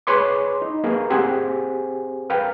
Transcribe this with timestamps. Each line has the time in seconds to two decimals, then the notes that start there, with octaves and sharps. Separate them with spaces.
0.07 G#4 B4 C#5 C6 D6
0.62 D#4
0.84 A#3 G#4 B4
1.10 C4 G4 G#4 C5 F#5 G#5
2.30 A#4 B4 F5 G5